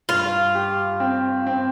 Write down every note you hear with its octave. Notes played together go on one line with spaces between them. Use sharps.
G2 F4
G4
C4
C4